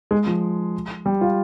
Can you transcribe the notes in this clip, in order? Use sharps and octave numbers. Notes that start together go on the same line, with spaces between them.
G#3
F3
G3
F4